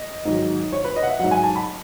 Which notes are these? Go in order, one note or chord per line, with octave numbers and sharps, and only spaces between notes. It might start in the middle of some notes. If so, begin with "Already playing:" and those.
Already playing: D#5
G#2 D#3 F#3
C#5
B4
D#5
F#5
E5
G#2 F#3 F#5
G#5
A5
B5